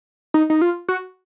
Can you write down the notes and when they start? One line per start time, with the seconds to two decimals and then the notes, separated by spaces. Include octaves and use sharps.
0.34 D#4
0.50 D#4
0.62 F4
0.89 F#4